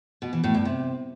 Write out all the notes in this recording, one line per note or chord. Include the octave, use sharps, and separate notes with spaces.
B2
E3
A2
G2
C3